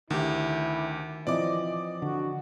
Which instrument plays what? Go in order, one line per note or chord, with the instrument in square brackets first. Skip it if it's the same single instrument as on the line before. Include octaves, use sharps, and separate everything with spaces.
[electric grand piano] D2 G4 [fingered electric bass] D#3 [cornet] E4
[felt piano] E3 F3 C4 [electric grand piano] D5 D6 [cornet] D#5
[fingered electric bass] D3 [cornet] F#4